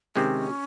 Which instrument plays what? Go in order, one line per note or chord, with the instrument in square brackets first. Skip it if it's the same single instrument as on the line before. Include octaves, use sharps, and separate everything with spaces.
[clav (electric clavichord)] C3 D#3 G#3 C4 [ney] C#4